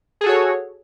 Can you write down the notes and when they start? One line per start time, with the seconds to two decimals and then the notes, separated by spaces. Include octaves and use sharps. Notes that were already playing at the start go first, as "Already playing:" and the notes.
0.21 G#4
0.23 A4
0.26 F#4
0.29 C#5